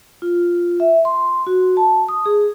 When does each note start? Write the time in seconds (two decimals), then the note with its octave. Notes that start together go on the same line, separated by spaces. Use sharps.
0.22 F4
0.80 E5
1.05 C6
1.47 F#4
1.77 A5
2.09 D#6
2.26 G#4